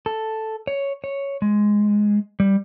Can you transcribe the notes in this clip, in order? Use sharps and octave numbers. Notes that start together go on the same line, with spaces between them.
A4
C#5
C#5
G#3
G3